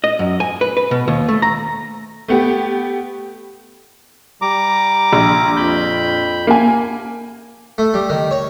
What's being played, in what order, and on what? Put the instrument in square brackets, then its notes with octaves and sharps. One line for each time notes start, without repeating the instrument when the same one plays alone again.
[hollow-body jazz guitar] D#5
F#2
G#5
B4
B4
B2
D#2
A3
A#5
[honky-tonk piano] A3 B3 G4
[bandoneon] G3 A#5 D6
[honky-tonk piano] A#1
[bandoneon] F2 B5 G6
[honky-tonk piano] A#3 G#5
[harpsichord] A3
G3
D#3
C#5